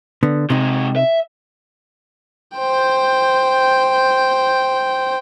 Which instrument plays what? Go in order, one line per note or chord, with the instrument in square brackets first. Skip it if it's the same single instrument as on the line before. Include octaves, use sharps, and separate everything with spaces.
[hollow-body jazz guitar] D3 B3
[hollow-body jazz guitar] C3 D#4 [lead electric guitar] G#3 F#4
[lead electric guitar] E5
[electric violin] C5 G5